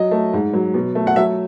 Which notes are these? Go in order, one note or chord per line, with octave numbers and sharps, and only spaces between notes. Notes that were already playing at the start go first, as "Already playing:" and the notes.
Already playing: F#3 D#5
A3
G#2
F#3
B2
A3
F#5
F#3 E5